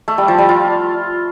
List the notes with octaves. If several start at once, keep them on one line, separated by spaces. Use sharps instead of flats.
A3
G3
F3
G3
F4